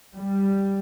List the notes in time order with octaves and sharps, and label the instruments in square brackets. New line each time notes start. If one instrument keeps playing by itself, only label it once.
[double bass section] G3